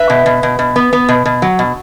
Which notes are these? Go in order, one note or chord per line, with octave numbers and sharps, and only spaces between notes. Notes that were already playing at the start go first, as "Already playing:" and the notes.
Already playing: B4 E5
B2
B2
B2
B2
B3
B3
B2
B2
F#3
B2